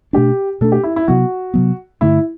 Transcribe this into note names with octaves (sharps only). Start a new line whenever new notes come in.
B2 A3 D4 G4
B2 A3 D4 A4
G4
E4
E4
C3 F#3 B3 F#4
C3 F#3 B3
G2 D3 A3 E4